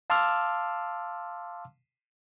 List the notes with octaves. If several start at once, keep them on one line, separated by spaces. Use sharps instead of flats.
F5 A5 C6 D6 E6 F6